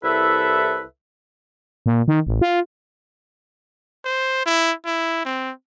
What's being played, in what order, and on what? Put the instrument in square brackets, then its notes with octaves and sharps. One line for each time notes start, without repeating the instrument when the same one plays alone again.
[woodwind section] C2 E4 A4 B4 E5
[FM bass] A#2
D#3
A1
F4
[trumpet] C5
E4
E4
C4